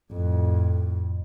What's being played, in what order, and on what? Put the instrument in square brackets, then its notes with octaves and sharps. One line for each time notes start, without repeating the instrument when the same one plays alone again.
[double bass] F2 A2